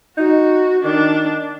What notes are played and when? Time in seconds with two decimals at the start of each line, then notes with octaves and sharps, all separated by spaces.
0.17 D#4 F#4
0.84 D#3 D4